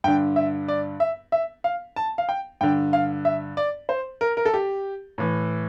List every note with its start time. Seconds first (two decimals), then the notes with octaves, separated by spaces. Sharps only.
0.04 G2 D3 G5
0.36 E5
0.68 D5
1.00 E5
1.32 E5
1.64 F5
1.96 A5
2.18 F5
2.29 G5
2.61 G2 D3 G5
2.93 F5
3.25 E5
3.57 D5
3.89 C5
4.21 A#4
4.37 A#4
4.45 A4
4.54 G4
5.18 A2 E3